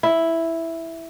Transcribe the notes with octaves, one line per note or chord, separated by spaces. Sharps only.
E4